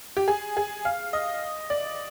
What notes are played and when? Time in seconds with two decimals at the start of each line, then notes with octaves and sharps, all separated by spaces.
0.17 G4
0.28 G#4
0.57 G#4
0.85 F5
1.13 D#5
1.70 D5